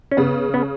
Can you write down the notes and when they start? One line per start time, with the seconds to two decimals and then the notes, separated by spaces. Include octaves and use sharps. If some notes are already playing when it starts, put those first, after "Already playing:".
0.12 C#4
0.17 C#3 B3
0.54 B3